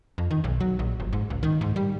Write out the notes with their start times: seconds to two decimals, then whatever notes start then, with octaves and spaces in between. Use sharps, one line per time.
0.18 F2
0.31 D#3
0.44 B1
0.60 F#3
0.79 A#1
1.00 G1
1.13 G#2
1.30 C#2
1.43 D#3
1.61 G#2
1.76 G3